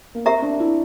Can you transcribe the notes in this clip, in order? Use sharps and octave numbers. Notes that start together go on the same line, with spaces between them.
A#3
C4 G4 A#4 E5 A#5
D4
E4